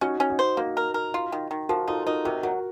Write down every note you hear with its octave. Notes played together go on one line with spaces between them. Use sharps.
C#4 D#4 F#4
C#4
D#4 F#4
C5
A#3 D#4 F#4
A#4
A#4
F4
D#3
D#3
F3 F#4 A#4
D#4 F4 A4
D#4 F#4 A#4
C3 F#4 A#4
F#3 F#4 A#4